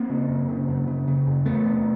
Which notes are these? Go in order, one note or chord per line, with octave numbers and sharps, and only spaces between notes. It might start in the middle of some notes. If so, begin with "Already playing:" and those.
Already playing: A#3 C4
C#3
F#2
C#3
F#2
C#3
C#3
F#2
E2 A3 B3
C3